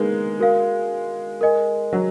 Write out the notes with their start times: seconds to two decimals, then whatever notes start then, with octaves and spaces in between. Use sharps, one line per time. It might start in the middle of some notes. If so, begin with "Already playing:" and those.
Already playing: G#3 A#3 B3 D#4
0.39 F#4 A#4 F5
1.41 A#4 D#5 G#5
1.93 F#3